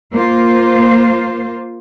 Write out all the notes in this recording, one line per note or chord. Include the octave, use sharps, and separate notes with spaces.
A#3 F4 C5